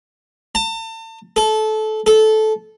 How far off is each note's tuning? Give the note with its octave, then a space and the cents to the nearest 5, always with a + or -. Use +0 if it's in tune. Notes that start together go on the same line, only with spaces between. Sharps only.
A5 +40
A4 -20
A4 -15